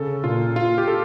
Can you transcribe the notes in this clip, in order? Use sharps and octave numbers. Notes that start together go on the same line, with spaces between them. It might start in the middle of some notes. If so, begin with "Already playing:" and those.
Already playing: C#3 A4
A#2 F4
F4
G4
A4